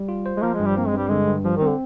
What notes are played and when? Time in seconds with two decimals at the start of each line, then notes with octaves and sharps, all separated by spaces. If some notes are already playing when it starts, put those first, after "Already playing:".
Already playing: G3
0.09 F4
0.26 C5
0.37 G#3
0.42 F3 A#3
0.54 G#3
0.60 G2
0.65 G3
0.77 A#3 C4
0.87 G#3
0.94 G2 G3
1.08 D3 G#3
1.27 G2
1.45 F3 G3
1.56 D#3
1.62 C4
1.68 D3